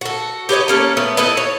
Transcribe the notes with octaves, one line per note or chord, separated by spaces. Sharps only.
F#4 A4
G4 B4 C#5 D#5
A#3 C#4 A4
A3 B3
E4 A4 B4 D#5
C#5